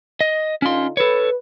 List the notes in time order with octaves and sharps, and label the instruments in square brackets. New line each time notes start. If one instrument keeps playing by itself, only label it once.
[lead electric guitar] D#5
[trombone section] D3 D#4 F4 [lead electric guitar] C#4 C6
[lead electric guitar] A4 C#5 [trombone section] B4